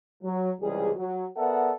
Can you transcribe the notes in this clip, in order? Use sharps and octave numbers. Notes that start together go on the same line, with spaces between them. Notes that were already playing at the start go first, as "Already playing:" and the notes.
F#3
C#2 C3 E3 G3 G#4
F#3
B3 A4 A#4 D5 E5 F#5